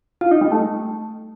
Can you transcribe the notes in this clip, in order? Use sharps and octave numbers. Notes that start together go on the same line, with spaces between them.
F4
D#4
G3
A3